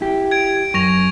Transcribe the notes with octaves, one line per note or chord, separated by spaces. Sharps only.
E4 G4
G#6 D7
F#2 C#6 A#6 F7